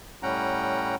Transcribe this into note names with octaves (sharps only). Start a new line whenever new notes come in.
A2 G3 C#4 F#5 G5 A#5